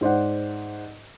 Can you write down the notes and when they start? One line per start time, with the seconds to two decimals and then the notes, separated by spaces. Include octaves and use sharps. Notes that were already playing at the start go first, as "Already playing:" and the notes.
0.01 G#2 C5 D5 F#5